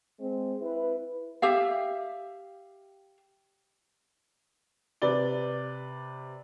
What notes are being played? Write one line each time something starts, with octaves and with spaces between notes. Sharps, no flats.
G#3 C4
E4 B4
G4 E5 F5
C3 B4 D5 G7